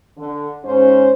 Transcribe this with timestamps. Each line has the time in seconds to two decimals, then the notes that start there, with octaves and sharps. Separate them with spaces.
0.17 D3
0.64 G#2 C#4 C5